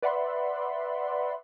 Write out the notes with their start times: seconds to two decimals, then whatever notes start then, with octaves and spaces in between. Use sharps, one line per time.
0.02 B4 D5 E5 F#5 B5 C6